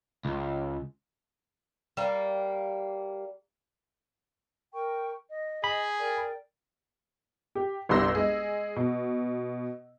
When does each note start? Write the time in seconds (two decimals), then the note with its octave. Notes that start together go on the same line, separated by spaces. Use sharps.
0.25 C#2
1.97 G3 A#3
4.73 A#4 G5 C#6
5.29 D#5
5.64 G#4 B5
5.99 A#4 D5 G5
7.55 G4
7.89 G1 C2 G3 C6 E6 A#6
8.15 G#3 G#4
8.76 B2